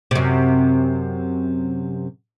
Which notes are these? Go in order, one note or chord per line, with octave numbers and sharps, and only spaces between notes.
F#2 C3